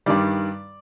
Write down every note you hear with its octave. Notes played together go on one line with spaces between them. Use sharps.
G2 D#3 G3 D5